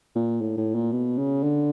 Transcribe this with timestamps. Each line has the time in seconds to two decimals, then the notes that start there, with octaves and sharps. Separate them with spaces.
0.15 A#2
0.41 A2
0.57 A2
0.75 A#2
0.92 B2
1.18 C#3
1.43 D3